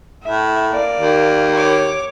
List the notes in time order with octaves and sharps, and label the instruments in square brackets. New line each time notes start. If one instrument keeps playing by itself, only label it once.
[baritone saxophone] A2 [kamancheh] E5
[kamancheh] A#3 D5
[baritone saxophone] D#2
[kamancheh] C#5 D6